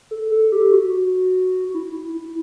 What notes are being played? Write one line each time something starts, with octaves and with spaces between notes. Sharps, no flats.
A4
A4
G4
F#4
E4
E4
E4